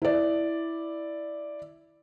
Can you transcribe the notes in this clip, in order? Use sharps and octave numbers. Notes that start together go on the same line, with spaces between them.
E4 D5